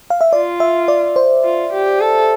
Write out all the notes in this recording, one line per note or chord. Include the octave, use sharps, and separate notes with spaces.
F5
E5
F4 D5
E5
D5
C5
F4
G4
A4